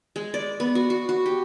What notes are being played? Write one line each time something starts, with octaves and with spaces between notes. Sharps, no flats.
G#3
D5
B3
F#4
F#4
F#4
G4